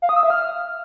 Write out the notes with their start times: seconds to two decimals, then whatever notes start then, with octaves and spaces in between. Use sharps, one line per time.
0.02 F5
0.09 D#6
0.16 E6
0.23 E5
0.30 F6